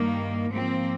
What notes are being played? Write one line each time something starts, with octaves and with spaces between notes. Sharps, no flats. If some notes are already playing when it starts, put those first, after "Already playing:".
Already playing: G2 D#3 G3 A#3
G#2 F3 A#3 C4